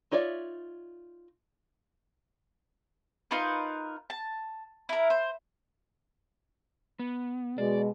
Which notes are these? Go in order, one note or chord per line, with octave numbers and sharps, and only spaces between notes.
D#4 F4 C#5 D5 E5
D#4 F4 A#4 B4
A5
E4 A#4
C5
B3
B2 G#3 D5